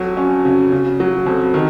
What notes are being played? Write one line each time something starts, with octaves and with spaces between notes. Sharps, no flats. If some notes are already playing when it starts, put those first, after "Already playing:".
Already playing: F2 F#3
C#4
C#3
C#3
F#3
F2
D#3